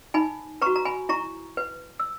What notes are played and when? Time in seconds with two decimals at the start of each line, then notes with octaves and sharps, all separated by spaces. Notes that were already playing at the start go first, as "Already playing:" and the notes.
0.14 D#4 G#5 B5
0.61 B4 A#5 C#6
0.66 F#4
0.76 A#5
0.85 G#5 B5
1.09 E4 A#5 C#6
1.57 B4
2.00 E6